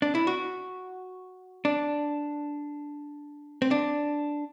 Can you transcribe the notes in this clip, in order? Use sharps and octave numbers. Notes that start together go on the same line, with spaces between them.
D4
E4
F#4
D4
C4
D4